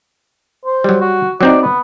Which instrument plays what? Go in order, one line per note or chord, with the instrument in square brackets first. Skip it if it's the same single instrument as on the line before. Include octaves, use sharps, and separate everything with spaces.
[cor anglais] C5
[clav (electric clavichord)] F#3 G3
[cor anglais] F#4
[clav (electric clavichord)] F#3 C4 D#4 [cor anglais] D5
[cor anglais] B3